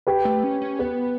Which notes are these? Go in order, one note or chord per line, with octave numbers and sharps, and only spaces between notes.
G4 B4
A3
C#4
C#4
B3 G4 B4